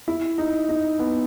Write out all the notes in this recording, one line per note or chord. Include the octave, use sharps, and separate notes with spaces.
E4
D#4
D#4
B3